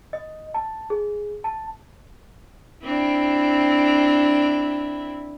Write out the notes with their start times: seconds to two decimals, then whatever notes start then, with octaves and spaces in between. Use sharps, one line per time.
0.13 D#5
0.54 A5
0.90 G#4
1.44 A5
2.84 C4 D4 E4